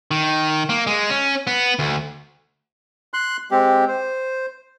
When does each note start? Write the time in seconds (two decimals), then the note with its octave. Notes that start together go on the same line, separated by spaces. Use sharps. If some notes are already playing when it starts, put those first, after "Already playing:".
0.11 D#3
0.69 A#3
0.87 G#3
1.10 C#4
1.47 B3
1.79 D2
3.14 C6 F#6
3.51 G#3 C4 G4
3.88 C5